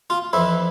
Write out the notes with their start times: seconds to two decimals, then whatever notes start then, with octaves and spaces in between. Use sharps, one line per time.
0.10 F4
0.33 F2 E3 E4